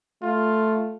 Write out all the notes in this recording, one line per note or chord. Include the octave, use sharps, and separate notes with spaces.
A3 F4